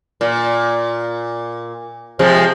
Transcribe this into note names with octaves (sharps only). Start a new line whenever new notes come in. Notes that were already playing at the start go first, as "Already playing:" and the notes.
A#2
C3 F3 G#3